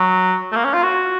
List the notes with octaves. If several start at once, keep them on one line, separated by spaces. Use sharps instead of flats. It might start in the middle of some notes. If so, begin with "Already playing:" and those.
Already playing: F#3
A3
A#3
C#4
F4
F#4